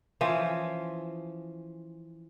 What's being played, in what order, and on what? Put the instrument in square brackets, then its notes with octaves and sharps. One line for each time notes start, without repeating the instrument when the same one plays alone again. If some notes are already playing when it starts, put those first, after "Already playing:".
[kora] E3 F3 C#4